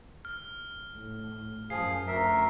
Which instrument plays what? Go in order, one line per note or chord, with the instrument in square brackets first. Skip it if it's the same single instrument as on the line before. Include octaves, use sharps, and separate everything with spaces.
[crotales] F6
[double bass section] A2
[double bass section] F#2 [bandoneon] F3 G#4 F5 [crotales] C7
[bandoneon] D2 A#4 E5